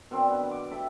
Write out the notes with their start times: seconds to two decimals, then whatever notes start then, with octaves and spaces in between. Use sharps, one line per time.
0.11 B2 D#3 C4 D4
0.30 B3
0.51 D6
0.71 G4 A4 E5